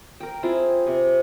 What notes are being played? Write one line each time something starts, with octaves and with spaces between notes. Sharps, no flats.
A#4 G5
C4 E4 F4 G#4
C3